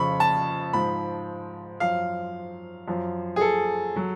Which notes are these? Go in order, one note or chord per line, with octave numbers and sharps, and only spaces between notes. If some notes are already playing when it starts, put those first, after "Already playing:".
Already playing: F2 C#3 F3 B5 C#6
A5
G#2 F3 B5
F#2 F3 F5
F#2 F3
G#4
A4
F#3